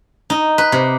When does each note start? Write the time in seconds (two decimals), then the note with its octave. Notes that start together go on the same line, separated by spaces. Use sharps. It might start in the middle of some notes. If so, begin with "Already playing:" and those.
0.30 D#4
0.58 B4
0.72 C3